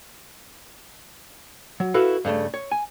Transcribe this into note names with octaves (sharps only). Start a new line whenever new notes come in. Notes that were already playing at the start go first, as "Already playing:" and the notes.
F#3
E4 F#4 A4 B4 F5
G2 C#3 A3
C#5
G#5